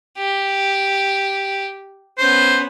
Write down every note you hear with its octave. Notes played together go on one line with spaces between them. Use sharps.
G4
B3 C#4 C5